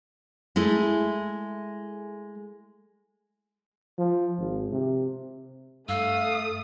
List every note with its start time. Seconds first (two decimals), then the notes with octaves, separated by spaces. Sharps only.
0.56 G#3 A3 E4 A4
3.98 F3
4.38 G#1
4.71 C3
5.89 G2 A3 F5 D#6 E6